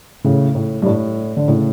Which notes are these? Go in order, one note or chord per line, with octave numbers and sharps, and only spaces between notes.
A2 C#3
A2
G2
A2
D3
A2 C#3